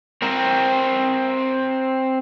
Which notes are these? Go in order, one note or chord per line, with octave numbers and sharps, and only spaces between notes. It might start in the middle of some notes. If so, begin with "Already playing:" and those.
C4 A#4